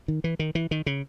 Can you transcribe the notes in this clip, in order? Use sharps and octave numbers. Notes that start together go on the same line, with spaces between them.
D#3
E3
D#3
E3
D#3
C#3